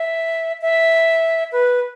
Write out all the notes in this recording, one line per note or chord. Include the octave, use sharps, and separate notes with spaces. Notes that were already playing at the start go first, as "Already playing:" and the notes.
Already playing: E5
E5
B4